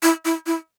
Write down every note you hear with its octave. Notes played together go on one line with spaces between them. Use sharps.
E4
E4
E4